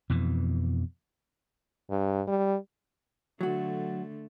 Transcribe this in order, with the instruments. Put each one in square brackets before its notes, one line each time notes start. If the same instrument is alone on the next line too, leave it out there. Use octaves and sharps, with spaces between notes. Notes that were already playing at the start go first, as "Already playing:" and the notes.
[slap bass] F2 B2 E3
[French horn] G2
G3
[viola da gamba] D3 A3 [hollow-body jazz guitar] F#3 F#4